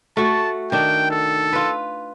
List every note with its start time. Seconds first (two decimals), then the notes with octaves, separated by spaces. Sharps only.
0.17 A3 F#4 A5
0.72 D#3 D4 G5
1.11 A4
1.53 F4 B4